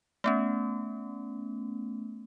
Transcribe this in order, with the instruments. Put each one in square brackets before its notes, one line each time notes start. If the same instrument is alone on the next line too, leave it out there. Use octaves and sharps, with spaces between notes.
[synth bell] A3 B3 C#4